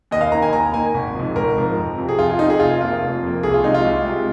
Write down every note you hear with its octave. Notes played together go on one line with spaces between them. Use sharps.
D#2 D#5
F5
D#3 A#3 A#5
G#5
D#2 A#5
D#3 A#3 G#5
G#1
G#2 F3
G#1 A#4
G#2 F3
F2
C3 F3
G#4
F2 F4
F4
C3 F3 D#4
G#4
F1 F4
F2 F3 A#3 F4
F1
F2 F3 A#3
C2 G#4
F4
C3 G#3 D#4
F4
C2
C3 G#3